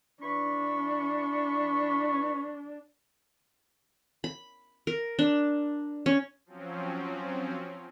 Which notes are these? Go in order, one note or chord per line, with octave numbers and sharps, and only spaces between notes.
E3 D4 B5 C#6
B5
A#4
D4
C#4
F3 F#3 C4 C#4